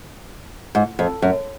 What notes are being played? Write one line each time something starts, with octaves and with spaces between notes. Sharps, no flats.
G#2
F2
F#2